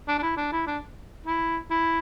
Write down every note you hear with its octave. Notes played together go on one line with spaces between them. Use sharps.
D4
D4
E4
D4
E4
D4
E4
E4